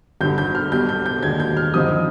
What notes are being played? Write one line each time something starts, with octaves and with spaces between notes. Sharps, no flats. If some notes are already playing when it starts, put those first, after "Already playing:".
G1 G2 D3 G6
G6
F6
B1 B2 G3 G6
G6
G6
D#2 D3 G#3 D4 G#6
G6
F6
G2 D3 F3 C4 D#4 D#6